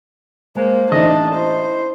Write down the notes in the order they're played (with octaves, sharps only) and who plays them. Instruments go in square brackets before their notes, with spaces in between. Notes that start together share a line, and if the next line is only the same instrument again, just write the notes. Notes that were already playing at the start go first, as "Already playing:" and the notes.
[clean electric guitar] G#3 [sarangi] A#3 [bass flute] C5
[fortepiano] A1 D#4 [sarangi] D4 [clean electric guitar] D#5
[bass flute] E4 [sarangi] C5